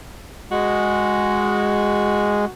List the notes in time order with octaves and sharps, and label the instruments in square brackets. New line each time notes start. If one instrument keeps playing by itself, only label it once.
[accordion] G#3 [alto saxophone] F#4